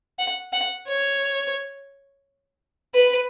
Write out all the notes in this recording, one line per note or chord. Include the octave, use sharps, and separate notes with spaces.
F#5
F#5
C#5
B4